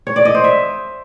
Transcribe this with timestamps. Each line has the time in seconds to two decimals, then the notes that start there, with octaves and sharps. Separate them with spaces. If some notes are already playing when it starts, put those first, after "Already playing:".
0.07 C#5
0.16 D5
0.25 D#5
0.35 C5
0.44 E5